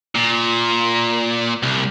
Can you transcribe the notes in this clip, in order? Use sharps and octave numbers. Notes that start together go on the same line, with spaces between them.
A#2
C2